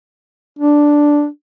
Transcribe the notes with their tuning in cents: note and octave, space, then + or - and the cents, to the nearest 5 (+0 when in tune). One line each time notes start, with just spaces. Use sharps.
D4 +0